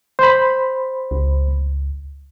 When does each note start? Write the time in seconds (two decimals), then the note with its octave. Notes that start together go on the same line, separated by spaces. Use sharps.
0.19 C5 B5
1.11 C#2